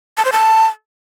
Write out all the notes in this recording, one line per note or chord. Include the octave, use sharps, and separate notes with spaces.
A5
C5
A5